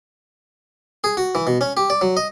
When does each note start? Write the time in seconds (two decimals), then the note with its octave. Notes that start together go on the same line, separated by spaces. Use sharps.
1.04 G#4
1.17 F#4
1.35 E3
1.47 B2
1.61 C#4
1.77 G4
1.90 D5
2.01 F#3
2.17 D#5